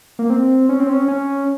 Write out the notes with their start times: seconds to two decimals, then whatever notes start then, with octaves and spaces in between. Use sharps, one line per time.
0.19 A#3
0.30 C4
0.69 C#4
0.80 C4
0.89 C#4
1.08 C#4